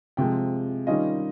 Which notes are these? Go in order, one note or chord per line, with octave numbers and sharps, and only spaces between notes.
C3 F3 G#3 G5
D#3 G3 C#4 F4 D#5